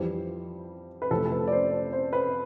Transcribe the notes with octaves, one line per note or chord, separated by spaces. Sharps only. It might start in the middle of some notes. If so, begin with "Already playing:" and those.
Already playing: F2 E3 G3 C5
B4
F2 C3 E3 A3 A4
A4
B4
D5
C5
D5
C5
B4